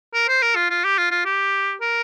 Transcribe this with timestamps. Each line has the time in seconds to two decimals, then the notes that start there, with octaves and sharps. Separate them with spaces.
0.14 A#4
0.28 C5
0.42 A#4
0.55 F4
0.70 F4
0.84 G4
0.98 F4
1.11 F4
1.25 G4
1.81 A#4